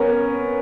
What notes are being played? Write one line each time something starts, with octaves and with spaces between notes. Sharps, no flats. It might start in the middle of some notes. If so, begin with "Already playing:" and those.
Already playing: B3 C#4 A#4